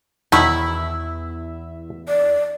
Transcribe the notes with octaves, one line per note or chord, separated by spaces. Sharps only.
E2 B2 D#3 E4 E5 B5
D5